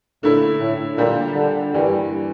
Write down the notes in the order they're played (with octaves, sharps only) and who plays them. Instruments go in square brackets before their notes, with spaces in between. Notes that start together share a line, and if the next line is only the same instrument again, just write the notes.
[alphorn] A#2 [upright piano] D3 A3 E4
[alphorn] A2
[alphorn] A#2 [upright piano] D3 G3 D4 G4
[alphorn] D3
[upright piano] G2 E3 A#3 [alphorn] G3